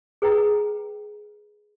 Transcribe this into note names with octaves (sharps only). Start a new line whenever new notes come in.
G#4 B4 G5 A#5